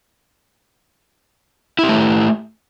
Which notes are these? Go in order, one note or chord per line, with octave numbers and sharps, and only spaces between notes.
A3 E4 G4